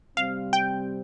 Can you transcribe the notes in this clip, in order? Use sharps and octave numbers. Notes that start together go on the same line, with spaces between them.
C3 G3 C4 F5
G5